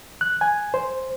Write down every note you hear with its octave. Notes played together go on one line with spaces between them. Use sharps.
F#6
G#5
C5